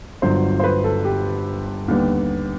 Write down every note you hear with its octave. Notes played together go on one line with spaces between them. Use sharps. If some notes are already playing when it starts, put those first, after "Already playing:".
G1 G2 D3 F#3 C5
C5
B4
A4
G4
D#2 D3 G3 B3